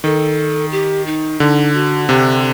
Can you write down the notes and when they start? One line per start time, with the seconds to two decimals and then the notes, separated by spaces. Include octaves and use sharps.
0.04 D#3 A4
0.72 G4
1.06 D#4
1.40 D3 D#4
1.74 F#4
2.09 C3 G4